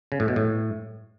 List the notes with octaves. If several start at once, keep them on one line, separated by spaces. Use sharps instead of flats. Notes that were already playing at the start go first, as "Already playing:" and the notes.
C#3
A2
B2
A2